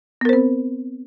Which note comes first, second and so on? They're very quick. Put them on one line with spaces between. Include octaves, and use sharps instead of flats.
B3 A#4 C5 C4